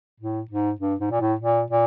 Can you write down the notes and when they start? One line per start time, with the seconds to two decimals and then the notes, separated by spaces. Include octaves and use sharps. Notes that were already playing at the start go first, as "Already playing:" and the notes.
0.20 A2
0.50 G#2
0.81 G2
1.00 G#2
1.11 A#2
1.21 A2
1.41 A#2
1.71 A#2